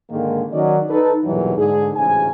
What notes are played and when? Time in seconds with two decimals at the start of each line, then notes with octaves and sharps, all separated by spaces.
0.10 G#2 D3 D#3 G#3 A#3
0.52 D#3 F#3 C#4 F#4 D5 D#5
0.89 D#4 A4 B4
1.25 B1 E2 G2 A#2 E3 F#3
1.57 G#2 D3 G#4
1.96 A1 D2 G#2 C#3 G#5